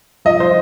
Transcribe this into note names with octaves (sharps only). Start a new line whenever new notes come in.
F3 D#5
F3 C5